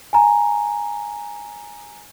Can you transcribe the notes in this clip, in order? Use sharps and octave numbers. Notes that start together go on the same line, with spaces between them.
G#5 A#5